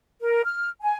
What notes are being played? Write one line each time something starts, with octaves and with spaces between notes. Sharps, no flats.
A#4
F6
G#5